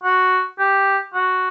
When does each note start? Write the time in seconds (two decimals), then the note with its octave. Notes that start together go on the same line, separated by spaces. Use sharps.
0.04 F#4
0.59 G4
1.14 F#4